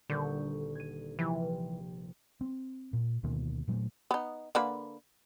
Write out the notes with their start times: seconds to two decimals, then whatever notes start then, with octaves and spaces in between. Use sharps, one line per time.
0.10 D#1 D3 C#6 G6
0.75 G#6 D#7
1.19 C3 E3 F3
2.41 C4
2.93 A#2
3.23 D2 B2 D#3 A#3
3.68 A#2 F#3 G3 A3
4.11 B3 D#4
4.55 D3 A#3 B4